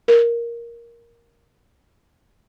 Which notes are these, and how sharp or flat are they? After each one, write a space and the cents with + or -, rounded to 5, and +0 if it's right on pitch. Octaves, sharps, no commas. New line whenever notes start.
A#4 +5